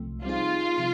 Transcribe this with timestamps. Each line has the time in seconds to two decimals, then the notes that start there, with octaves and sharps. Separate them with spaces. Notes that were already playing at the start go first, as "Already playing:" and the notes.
Already playing: C2 C3 F3 A3
0.24 G3 C4 D#4 F4 G#4
0.78 C3 F3